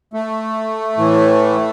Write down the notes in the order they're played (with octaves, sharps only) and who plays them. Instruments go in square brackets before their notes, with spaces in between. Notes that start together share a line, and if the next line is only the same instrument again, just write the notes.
[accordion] A3
A2 E3